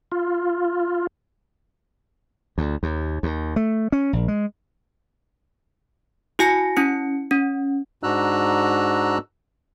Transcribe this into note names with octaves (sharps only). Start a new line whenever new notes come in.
F4
D2
D#2
D#2
A3
C#4
A#1
G#3
E4 F#4 G#5 A#6 C#7
C#4 E4 C#7
C#4
G#2 D4 F#4 A#5 E6 F#6